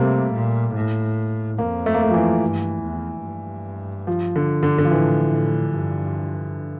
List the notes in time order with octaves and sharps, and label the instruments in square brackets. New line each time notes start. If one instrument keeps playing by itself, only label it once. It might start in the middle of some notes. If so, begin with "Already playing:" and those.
Already playing: [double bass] C3 [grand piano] G3 A3 A#3
[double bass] A#2
A2
[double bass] F2 [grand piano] A#3
[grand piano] A3
A#3
A3
F3
E3
[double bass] G2
E2
G2
[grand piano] F3
D3
D3
D3
F3
[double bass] A2 [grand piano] E3
[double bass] A2
G2